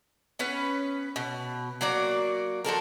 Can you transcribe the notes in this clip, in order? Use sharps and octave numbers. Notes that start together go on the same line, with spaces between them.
B3 C#4 B4
B2
F#3 A#3 F#4 D5
F3 F#4 A4 A#4